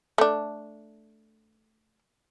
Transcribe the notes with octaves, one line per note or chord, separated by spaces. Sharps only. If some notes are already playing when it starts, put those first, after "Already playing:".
A3 D4